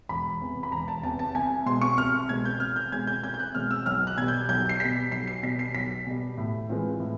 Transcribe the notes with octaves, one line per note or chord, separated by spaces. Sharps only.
E1 B5
E2 C3
B5
E1 A#5
A5
E2 C3 A5
A5
C2 G#5
B2 G#3 C4 C6
C#6
C2 F6
B2 G#3 C4 G#6
G6
C2 F6
G6
B2 G#3 C4 G#6
G6
C2 G6
G6
F#6
B2 G#3 C4 F6
E6
B1 F6
F#6
B2 G3 G#6
G6
B1 G6
C7
B2 G3 B6
B1 C7
C7
B2 G3 B6
C7
B1 B6
B2 G3
A2
E3 G#3 C4 F4
A2